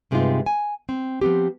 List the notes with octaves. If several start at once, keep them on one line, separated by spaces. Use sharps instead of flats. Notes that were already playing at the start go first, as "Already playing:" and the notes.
G2 C3 G#3 B3 D#4 F4
G#5
C4
F3 B3 C4 G4